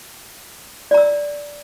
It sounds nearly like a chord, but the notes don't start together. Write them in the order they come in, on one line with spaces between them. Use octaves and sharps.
D5 A#5 E6